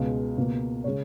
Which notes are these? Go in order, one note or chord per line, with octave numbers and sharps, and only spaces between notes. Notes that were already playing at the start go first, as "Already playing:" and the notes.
Already playing: C#2 B2 G#3 F5
C#2 B2 A#3
C#3 G#3 C#5